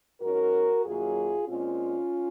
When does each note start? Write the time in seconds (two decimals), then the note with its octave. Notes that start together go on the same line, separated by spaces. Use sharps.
0.21 G#2 F#3 C#4 F#4 A#4
0.84 F#2 D#3 F#3 A#3 F4 G#4
1.48 A#2 G#3 C4 C#4 F4